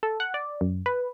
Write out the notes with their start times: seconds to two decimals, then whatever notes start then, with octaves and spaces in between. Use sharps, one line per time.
0.03 A4
0.20 F#5
0.34 D5
0.61 F#2
0.86 B4